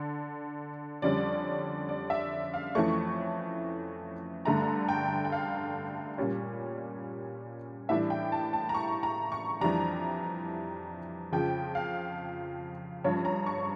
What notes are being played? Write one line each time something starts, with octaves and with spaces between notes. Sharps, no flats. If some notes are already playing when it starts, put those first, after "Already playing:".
Already playing: D3
F2 D3 G3 C#4 D5
D5
E5
F5
F2 E3 A3 C#4 C#6
G2 D3 A3 A#5
G5
G5
F5
A#2 G3 C#4
A2 E3 G3 D4 E5
G5
A5
A5
A#5
C#6
A#5
C#6
F2 E3 G3 D4 A#5
F2 C#3 F3 G5
F5
G2 F3 C#4 C#5
A#5
C#6